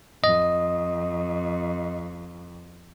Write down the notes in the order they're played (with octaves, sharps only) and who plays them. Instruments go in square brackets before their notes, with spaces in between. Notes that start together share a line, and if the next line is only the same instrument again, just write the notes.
[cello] F2 [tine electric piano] D#5